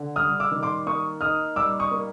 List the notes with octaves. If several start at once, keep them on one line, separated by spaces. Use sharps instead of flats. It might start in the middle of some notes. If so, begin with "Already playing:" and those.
Already playing: D3
G3 D#6 F6
D6 E6
D#3
C6 D6
A#3 C#6 D#6
D#4 D#6 F6
G3 D6 E6
C#6 D#6
A#3